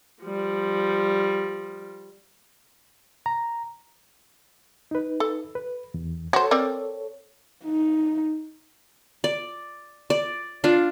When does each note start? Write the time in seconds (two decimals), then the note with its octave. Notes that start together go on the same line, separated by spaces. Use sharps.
0.23 F3 G3
3.26 A#5
4.91 D#4 B4
5.20 A4
5.55 B4
5.94 E2
6.33 F#4 A4 C5 C#5
6.51 C4 A#4 D5
7.65 D#4
9.24 D5
10.10 D5
10.64 D4 F4